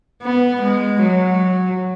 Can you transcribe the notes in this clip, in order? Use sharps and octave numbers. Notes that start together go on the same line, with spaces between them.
B3
G#3
F#3